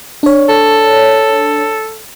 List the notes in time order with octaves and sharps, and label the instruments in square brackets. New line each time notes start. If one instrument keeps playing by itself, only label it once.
[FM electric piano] D4 C#5
[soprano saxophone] A4